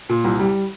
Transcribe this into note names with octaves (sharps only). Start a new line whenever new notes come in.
A#2
C2
G3